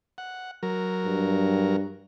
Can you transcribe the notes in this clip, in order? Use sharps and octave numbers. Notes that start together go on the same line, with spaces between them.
F#5
F#3 A#4
G2